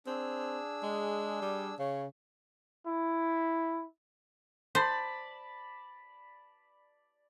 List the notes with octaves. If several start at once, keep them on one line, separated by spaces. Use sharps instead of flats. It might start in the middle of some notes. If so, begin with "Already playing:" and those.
C4 D4 G#4 E6
G#3
G3
C#3 C#5
E4
C5 D5 A5 B5